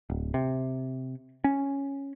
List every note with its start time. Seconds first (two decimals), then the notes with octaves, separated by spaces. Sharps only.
0.10 D1
0.34 C3
1.44 C#4